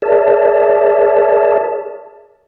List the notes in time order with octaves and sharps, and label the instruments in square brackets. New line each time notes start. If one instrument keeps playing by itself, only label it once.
[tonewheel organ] G#4 A#4 C#5 D5 E5 A5